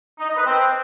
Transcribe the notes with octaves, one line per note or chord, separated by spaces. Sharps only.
D#4
D#5
B4
C4